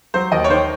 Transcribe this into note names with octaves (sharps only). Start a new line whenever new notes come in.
F#3 C5
D#2 D#5
C#5
D#3 C5